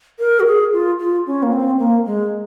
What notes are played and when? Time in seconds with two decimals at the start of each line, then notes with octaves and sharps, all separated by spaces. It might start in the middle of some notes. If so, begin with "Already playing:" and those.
0.19 A#4
0.40 F#4
0.46 G#4
0.73 F4
0.99 F4
1.27 C#4
1.43 A#3
1.53 C4
1.79 A#3
2.06 G#3